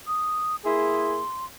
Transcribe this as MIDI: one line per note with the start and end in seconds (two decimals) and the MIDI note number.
0.07 0.56 87
0.65 1.22 58
0.65 1.22 64
0.65 1.22 68
0.65 1.45 84